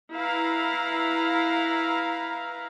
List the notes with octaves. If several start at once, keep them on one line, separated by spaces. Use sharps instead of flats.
E4 B4 F5 A#5